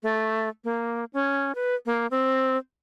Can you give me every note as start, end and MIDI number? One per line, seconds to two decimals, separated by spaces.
0.03 0.49 57
0.64 1.05 58
1.13 1.55 61
1.55 1.75 71
1.86 2.07 58
2.11 2.58 60